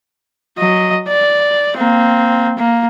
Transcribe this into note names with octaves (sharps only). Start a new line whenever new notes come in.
F#3 D#5
D5
A#3 C4
A#3